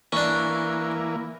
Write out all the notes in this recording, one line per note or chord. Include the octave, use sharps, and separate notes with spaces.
E3 A#3 C#4 D4